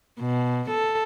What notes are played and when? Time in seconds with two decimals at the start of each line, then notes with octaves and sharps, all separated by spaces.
0.20 B2
0.70 A4